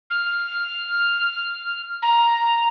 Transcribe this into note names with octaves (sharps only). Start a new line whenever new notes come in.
F6
A#5